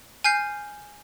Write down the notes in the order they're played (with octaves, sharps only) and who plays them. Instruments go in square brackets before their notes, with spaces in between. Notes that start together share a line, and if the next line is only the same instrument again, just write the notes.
[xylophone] G#5 F6 G6 C7